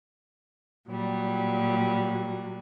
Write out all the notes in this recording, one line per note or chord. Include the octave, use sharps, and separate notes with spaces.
A#2 F#3 G3